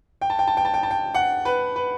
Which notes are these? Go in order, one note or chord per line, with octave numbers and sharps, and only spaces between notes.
G5
A5
G5
A5
G5
A5
G5
A5
G5
F#5
B4
B4